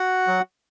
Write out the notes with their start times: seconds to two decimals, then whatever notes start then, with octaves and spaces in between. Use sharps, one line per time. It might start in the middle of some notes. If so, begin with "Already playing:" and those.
Already playing: F#4 F#5
0.28 F#3